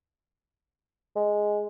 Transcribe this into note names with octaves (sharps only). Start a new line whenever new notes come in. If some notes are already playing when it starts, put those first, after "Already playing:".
G#3